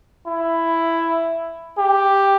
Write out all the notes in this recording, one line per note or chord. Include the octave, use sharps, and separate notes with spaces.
E4
G4